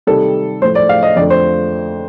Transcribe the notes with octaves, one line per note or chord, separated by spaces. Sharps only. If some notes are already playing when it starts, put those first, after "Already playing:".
C3 D#3 G3 A4
A2 F3 A3 C5
D5
F5
D#5
F2 D3 F3 A3 D5
C5